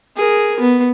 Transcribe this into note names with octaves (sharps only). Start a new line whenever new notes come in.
G#4 A#4
B3